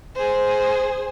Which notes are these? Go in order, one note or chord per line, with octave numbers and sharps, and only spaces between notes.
G#4 C5